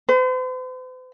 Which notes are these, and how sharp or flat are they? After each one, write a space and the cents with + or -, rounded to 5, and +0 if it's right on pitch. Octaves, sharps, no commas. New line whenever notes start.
C5 -45